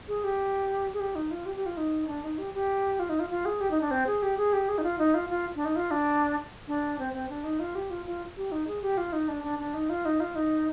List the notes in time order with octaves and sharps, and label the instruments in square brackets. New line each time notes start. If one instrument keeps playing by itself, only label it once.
[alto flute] G#4
G4
G#4
G4
D#4
F4
G4
G4
F4
D#4
D4
D#4
G4
G4
F4
D#4
F4
F4
G#4
G4
D#4
D4
C4
G#4
G4
G#4
G4
G#4
D#4
F4
D#4
F4
F4
D4
D#4
F4
D4
D4
C4
C4
D4
D#4
F4
G4
F4
F4
G4
D#4
G#4
G4
F4
D#4
D4
D4
D4
D#4
F4
D#4
F4
D#4